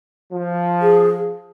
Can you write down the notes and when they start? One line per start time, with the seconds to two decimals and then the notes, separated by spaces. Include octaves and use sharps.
0.33 F3
0.82 G#4